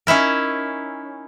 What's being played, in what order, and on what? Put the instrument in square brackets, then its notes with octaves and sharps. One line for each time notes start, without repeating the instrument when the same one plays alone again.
[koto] C#4 D#4 E4 A#4